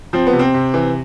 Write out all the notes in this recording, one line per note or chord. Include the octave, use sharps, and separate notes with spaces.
F3 C4
B3
C3
C4
C3
E3